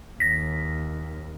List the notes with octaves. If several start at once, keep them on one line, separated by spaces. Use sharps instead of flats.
D#2 A#6 B6